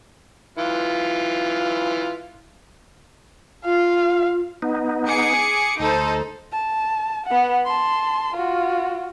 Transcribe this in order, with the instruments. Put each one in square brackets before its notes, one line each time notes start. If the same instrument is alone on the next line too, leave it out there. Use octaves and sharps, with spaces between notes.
[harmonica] E3 F4
[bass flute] F4 [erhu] F5
[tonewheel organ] B3 D#4
[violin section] G#4 D6 C#7
[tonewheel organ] D2 [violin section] D#4 A4 C5
[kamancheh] A5
B3 F#5
A5 C6
F4 F#4